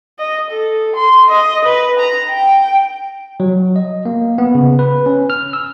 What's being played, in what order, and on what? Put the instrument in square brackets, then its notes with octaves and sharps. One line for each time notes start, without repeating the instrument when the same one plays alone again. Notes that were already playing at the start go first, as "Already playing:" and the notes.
[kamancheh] D#5
A4
C6
D#5
B4
A#5
G5
[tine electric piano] F#3
D#5
A#3
B3
C#3
B4
C#4
F6
E6